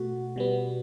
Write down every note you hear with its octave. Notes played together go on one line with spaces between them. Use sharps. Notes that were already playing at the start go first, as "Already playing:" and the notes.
Already playing: B2 A3 F#4
B2 G3 B3